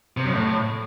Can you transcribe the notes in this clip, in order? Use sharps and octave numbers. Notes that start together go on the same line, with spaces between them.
C3
F#2
A2